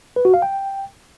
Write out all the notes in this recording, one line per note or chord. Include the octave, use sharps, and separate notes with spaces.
B4
F#4
F5
G5